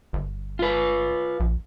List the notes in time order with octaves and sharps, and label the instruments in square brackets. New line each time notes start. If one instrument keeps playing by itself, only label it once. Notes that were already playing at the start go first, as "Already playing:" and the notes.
[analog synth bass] G1
[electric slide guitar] F4 B4
[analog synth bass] A#1